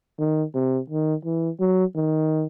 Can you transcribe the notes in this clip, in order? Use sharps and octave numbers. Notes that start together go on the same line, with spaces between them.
D#3
C3
D#3
E3
F#3
D#3